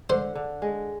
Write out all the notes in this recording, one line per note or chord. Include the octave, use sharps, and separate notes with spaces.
D3 C5
D3
G#3